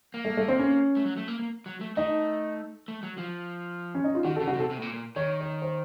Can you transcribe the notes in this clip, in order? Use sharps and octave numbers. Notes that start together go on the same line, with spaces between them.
A#3
A3
A3
C4
C#4
A3
F#3
A3
A#3
A#3
F#3
A3
A3 D#4
A3
F#3
F3
C#4
D#4
F4
D#3 F#4
A4
C#3
F#4
C3 A4
C3
A2
A#2
A#2
D#3 C#5
C#5
C5